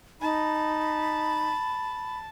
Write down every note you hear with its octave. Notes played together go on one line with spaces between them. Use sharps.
D#4 A5 B5